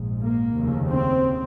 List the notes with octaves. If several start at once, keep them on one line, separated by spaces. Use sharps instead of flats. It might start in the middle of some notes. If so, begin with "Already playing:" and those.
Already playing: A#1 G#2
A#3
F1 D#2 C#3
C4